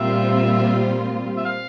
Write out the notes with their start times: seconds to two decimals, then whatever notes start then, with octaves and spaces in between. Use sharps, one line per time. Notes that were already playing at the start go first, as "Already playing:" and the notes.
Already playing: A#2 G3 C4 F4 E5
1.37 E5
1.45 F5